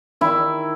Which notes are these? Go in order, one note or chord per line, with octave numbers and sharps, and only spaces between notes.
D#3 E4